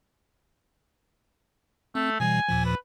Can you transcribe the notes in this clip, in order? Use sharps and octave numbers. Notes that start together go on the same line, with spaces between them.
A3 C4
B2 E3 G3 G#5
D#2 A#2 F3
B4